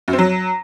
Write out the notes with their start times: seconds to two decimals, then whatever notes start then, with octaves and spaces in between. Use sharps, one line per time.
0.08 F#2
0.13 C4
0.19 F#3